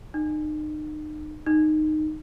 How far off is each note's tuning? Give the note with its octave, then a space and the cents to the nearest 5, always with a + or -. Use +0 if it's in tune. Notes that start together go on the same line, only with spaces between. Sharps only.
D#4 -35
D#4 -15